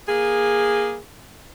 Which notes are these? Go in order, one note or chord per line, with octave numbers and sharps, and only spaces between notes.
A#3 G#4